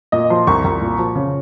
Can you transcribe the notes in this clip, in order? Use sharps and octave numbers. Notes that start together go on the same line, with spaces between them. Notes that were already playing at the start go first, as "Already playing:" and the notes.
A#2 D#5
F3 C6
C2 C#6
C2
A#2
F3
C#3